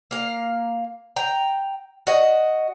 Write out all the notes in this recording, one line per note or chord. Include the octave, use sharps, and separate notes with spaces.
A#3 F5
G5 A#5
F#4 D#5